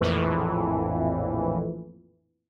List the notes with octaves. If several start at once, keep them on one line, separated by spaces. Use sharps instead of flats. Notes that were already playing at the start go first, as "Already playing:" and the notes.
A#1 F2 A2 E3